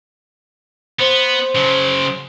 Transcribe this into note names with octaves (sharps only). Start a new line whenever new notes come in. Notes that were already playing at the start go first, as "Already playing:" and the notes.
B3 C5
C#3 F#3